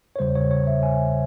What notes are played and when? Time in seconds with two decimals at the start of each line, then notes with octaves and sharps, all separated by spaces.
0.16 C#5
0.19 E2 C#3 G3 C5
0.35 C#5
0.51 C#5
0.67 E5
0.83 G#5